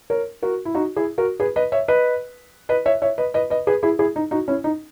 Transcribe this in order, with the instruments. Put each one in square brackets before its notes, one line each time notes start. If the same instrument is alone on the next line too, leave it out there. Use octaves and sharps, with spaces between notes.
[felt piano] A#4 C#5
F#4 A#4
E4
D#4 F#4
E4 G#4
F#4 A#4
G#4 B4
B4 D#5
C#5 E5
B4 D#5
B4 D#5
C#5 E5
C#5 E5
B4 D#5
B4 D#5
B4 D#5
G#4 B4
E4 G#4
E4 G#4
D#4
D#4 F#4
C#4 E4
D#4